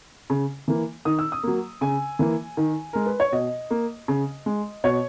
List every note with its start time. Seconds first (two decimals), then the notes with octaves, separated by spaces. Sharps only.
0.30 C#3
0.68 E3 A#3
1.05 D#3 D#6
1.19 E6
1.32 D#6
1.43 F#3 A#3
1.81 C#3 G#5
2.19 E3 A#3
2.57 D#3
2.93 G#3 A#4
3.06 B4
3.20 C#5
3.32 B2 D#5
3.71 A#3
4.08 C#3
4.46 G#3
4.84 B2 C#5